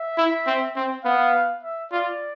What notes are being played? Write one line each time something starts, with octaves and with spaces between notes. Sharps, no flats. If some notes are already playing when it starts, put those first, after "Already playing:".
Already playing: E5
E4
C4
C4
B3 F5
E5
F4 D5